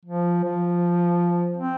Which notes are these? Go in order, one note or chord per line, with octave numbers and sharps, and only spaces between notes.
F3
F3
C4